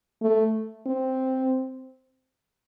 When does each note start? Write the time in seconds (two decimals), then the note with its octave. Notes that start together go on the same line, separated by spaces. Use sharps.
0.22 A3
0.86 C4